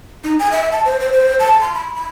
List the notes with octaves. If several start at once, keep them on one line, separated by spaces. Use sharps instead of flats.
D#4
G#5
E5
A5
C5
C5
C5
A5
C6
B5
B5